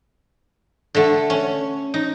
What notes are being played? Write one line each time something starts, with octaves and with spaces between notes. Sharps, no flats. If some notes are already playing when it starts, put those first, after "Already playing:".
D3 A3
C#4
D#4